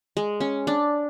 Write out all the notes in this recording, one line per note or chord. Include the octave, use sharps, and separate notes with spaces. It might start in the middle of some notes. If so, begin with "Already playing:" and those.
G#3
C#4
D4